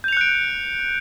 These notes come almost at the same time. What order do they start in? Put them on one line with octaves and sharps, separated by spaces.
G6 F7 C#7 F#6 D7